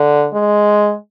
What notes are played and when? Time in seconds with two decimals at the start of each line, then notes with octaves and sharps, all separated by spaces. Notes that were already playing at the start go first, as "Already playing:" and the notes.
Already playing: D3
0.33 G#3